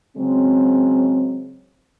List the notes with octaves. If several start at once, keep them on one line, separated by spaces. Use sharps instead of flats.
C#3 F#3 G#3 C4